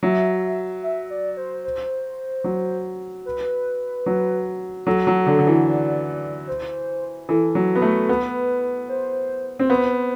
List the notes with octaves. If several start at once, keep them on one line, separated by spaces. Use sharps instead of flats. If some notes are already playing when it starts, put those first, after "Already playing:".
F#3 E5
E5
D5
C5
C5
F#3
B4
F#3
F#3 A4
F#3
D3
D3
E3
D5
C5
E3 A4
F#3
B3
A3
B3 B4
C5
C4
B3 C5